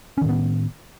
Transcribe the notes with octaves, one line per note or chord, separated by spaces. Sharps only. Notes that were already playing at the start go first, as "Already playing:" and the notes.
A2 D#3 B3 C#4